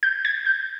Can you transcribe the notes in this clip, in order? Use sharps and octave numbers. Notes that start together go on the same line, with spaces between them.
G6
G#6
G6